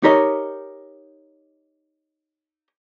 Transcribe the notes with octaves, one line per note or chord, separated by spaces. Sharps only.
D#4 G4 A#4 C#5 D#5